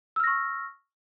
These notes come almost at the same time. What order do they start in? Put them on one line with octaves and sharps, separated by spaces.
E6 F6 A#6 C#6